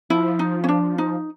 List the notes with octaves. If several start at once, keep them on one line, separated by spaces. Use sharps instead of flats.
F3 E4
D#4
C#4
D4
D#4